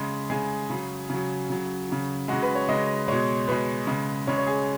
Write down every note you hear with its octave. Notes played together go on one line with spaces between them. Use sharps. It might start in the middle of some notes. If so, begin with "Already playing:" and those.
Already playing: C#3 G#3
C#3 G#3 G#4
C#3 F#3
C#3 F#3
C#3 F#3
C#3 F#3
C#3 G#3 F#4
B4
C#5
C#3 G#3 D#5
B2 G#3 C#5
B2 G#3 B4
C#3 G#3
C#3 G#3 C#5
C#5
G#4